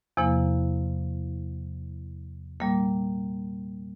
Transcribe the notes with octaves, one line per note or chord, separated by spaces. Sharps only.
E2 C3 F3 A#3 E4
A#2 G3 A#3